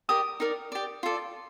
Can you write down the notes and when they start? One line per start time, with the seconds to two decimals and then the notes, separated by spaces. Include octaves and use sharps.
0.09 G4 A#4 D5 D#6
0.40 D#4 A#4 D5
0.72 G4 D5
1.03 F4 A4 D5